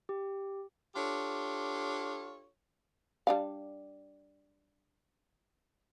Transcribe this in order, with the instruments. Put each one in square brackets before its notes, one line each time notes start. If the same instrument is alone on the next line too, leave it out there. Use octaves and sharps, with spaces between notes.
[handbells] G4
[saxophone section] D4 F4 G4 A4 C#5
[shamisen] G3 D4 F5